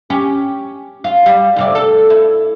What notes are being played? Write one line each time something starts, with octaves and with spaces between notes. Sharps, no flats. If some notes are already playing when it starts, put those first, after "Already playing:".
C#4 G4
F4
G3
D2 C3 D5
A4
E4